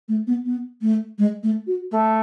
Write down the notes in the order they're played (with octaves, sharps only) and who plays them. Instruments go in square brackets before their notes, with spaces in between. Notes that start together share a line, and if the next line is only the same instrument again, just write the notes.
[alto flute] A3
B3
B3
A3
G#3
A3
F#4
[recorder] A3